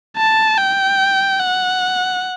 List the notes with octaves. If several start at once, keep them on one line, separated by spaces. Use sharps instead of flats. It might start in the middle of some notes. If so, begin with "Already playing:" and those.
A5
G5
F#5